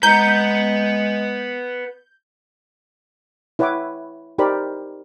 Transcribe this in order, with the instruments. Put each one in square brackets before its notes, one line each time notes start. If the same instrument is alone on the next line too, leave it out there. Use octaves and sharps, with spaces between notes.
[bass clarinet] G#3 [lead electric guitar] B4 F#5 [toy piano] A#5 [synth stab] G6
[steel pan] E4 B4 C#5 F#5 G5 D6
D#4 G4 A#4 C5 D5 B5